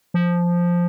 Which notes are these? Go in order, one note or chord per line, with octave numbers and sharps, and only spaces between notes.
F3